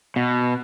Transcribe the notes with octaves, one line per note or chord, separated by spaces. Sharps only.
B2